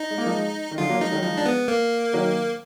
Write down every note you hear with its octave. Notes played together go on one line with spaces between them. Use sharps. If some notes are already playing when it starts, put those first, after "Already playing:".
Already playing: D#4
G#3
A#3
F3 G#3
D#3
D3 F3 F4
F#3 A#3
F3 G#3 D#4
D#3 F#3
F3 G#3 D#4
D4
B3
A#3
D#3 F#3